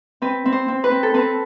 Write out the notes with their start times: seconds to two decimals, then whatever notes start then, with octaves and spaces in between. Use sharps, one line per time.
0.22 C4 B4
0.46 C4
0.52 C5
0.68 C4
0.84 B4
0.91 C4
1.03 A4
1.14 C4 B4